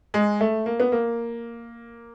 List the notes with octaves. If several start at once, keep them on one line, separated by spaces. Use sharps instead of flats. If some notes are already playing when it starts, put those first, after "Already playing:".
G#3
A3
A#3
B3
A#3